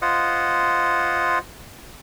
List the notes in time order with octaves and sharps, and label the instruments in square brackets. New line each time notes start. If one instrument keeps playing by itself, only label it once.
[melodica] F4 C5 D#5 F#5